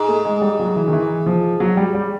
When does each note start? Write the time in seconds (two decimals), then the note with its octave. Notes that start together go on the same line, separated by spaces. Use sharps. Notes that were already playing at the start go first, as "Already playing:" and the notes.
Already playing: G#2
0.08 A3
0.25 G#3
0.41 G3
0.59 F#3
0.76 E3
0.88 D#3
0.93 E3
1.26 F3
1.60 F#3
1.77 G3
1.94 G3